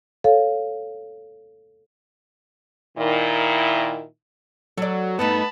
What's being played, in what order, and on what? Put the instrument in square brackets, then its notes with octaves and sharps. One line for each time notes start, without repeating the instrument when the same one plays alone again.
[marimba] A4 C#5 F5
[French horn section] A#2 D#3 E4
[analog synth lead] F#3 [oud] A4 D5
[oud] G2 A3 D#4 [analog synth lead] B3 [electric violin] A5 B5